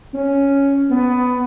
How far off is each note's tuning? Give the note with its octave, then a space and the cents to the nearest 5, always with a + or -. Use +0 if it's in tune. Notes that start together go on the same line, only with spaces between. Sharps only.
C#4 +5
B3 +15